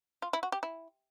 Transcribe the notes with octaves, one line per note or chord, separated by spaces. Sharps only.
F4
E4
F#4
G4
E4